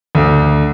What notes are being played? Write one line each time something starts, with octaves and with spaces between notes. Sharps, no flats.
D2